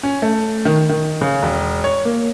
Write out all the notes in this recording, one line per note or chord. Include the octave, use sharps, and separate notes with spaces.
C#4
A3
D#3
D#3
C#3
E1
C#5
A#3